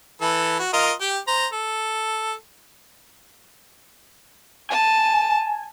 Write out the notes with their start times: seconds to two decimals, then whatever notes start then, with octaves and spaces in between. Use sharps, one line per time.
0.22 E3 A4 B4
0.59 F#4
0.73 F4 A#4 D#5
1.00 G4 G5
1.28 C5 A#5
1.53 A4
4.70 G#5 A5